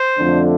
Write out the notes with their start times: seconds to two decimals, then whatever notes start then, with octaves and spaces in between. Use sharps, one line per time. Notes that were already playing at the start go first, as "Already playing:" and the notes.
Already playing: C5
0.18 F2 D3 A3 D4